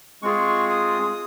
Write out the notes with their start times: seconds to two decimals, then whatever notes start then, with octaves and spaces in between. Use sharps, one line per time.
0.22 G#3 C4 F4 G#4 C#6
0.70 D#6